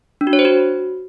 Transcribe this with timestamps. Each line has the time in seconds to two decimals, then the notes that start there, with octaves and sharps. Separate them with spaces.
0.21 D4
0.27 F#4
0.33 C#5
0.39 C5
0.45 F#4